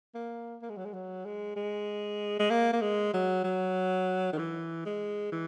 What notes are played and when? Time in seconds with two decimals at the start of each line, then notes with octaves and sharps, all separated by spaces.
0.15 A#3
0.62 A#3
0.70 G#3
0.77 F#3
0.85 G#3
0.94 F#3
1.25 G#3
1.56 G#3
2.40 G#3
2.50 A#3
2.73 A#3
2.82 G#3
3.14 F#3
3.44 F#3
4.33 D#3
4.38 E3
4.86 G#3
5.32 E3